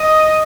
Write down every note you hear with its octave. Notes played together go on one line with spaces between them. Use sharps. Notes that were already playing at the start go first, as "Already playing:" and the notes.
Already playing: D#5